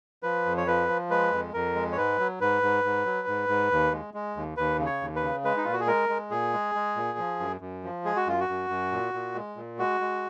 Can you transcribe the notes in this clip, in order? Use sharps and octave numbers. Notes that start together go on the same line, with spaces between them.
F3 B4
F2
C#5
F3 B4
F3
G#3 B4
F2
F2 A#4
G#3
C#5
G#2 B4
F#3
G#2 B4
G#2
G#2
F#3
G#2
G#2
D#2
G#3
G#3
D#2
D#2 B4
C#3
C#5
D#2
B4
C#3
G#3 B4
D#4
A#2 F4
F#4
G#4
G#3 A#4
G#3
A#2 G#4
G#3
G#3
A#2
F3
F#2
F#2
F3
G#3 G#4
F#4
F#2 F4
F#4
F#2
F#2
A#2
A#2
G#3
A#2
G#3 F#4
G#3